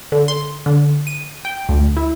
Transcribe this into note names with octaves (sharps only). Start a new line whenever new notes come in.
D3
C6
D3
D#7
G5
D2
E4